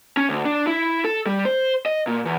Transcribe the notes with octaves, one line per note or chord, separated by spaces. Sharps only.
C#4
D2
D4
E4
A4
G3
C5
D#5
A#2
E2